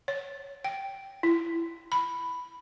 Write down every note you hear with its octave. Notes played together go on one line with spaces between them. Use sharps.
C#5
G5
E4
B5